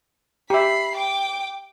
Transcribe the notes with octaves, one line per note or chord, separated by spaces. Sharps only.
G4 E5 B5 C7
G5 D6